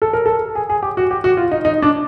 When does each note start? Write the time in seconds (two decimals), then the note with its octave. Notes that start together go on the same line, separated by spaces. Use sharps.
0.02 A4
0.13 A#4
0.26 A4
0.55 G#4
0.70 G#4
0.82 G4
0.97 F#4
1.11 G4
1.24 F#4
1.37 F4
1.51 D#4
1.65 D#4
1.82 D4